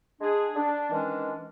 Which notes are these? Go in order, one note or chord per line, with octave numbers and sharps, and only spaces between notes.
G#3 D4 G#4
D4
D#3 E3 G#3 C#4 D4